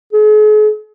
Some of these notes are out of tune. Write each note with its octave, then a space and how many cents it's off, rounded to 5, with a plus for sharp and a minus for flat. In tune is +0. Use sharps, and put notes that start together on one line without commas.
G#4 +45